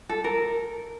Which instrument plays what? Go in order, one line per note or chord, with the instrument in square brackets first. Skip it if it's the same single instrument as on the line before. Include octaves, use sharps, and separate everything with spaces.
[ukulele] A4
A#4